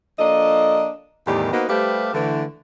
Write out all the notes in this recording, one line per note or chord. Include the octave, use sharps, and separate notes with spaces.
F3 A#3 D4 A4 D#5
E2 A2 D#3 G3 G4 A#4
A#3 B3 D#4 F#4 B4 C5
G3 A3 G4 B4 C5 F5
D3 E3 A3